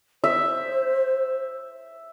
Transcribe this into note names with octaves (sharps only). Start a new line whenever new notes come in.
C5 E5